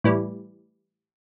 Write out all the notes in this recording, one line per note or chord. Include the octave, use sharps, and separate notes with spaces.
A2 E3 G3